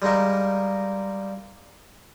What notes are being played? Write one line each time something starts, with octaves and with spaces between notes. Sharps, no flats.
G3 G#3 A#3 D#4 A#4